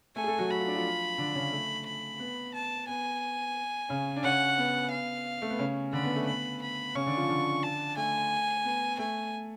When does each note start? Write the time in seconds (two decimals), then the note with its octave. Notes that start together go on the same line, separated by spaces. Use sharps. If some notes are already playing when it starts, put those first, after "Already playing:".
0.16 A3 A4 G#5
0.24 G#4
0.28 A3 A4
0.38 F#3 F#4
0.50 F#4 B5
0.59 F4
0.67 D4
0.76 F3 F4
1.18 D3 D4
1.35 C#3 C#4
1.52 A3
1.87 B5
2.19 B3
2.54 A5
2.88 B3 G#5
3.89 C#3 C#4
4.16 D4
4.23 C#3 C#4 F#5
4.58 B3
4.91 F5
5.42 A3
5.50 B3
5.59 C#3 C#4
5.93 D3 D4 B5
6.04 B3
6.16 A3
6.27 B3 B5
6.62 B5
6.95 C#3 C#4 C#6
7.06 D3 D4
7.17 F3 F4
7.28 D3 D4
7.63 A5
7.97 A3 G#5
8.64 B3
8.99 A3 G#5